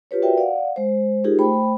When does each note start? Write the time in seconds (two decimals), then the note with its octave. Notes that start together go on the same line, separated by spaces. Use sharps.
0.11 F4 G4 B4 C#5
0.22 F#4 A#4 B4 D5 E5 G5
0.38 D5 F5 F#5
0.76 G#3 C5
1.24 D#4 F4 G4 G#4 A#4
1.39 A3 C5 G5 B5